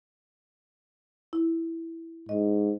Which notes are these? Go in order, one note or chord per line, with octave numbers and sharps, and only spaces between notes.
E4
G#2 D#5